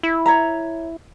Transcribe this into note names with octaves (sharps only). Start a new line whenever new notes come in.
E4
C#5 E5 A#5